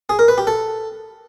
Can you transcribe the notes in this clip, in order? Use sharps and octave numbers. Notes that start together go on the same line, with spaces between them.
G#4
A#4
B4
G4
A4